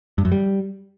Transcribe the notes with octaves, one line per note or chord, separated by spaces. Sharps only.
G2
F#2
G3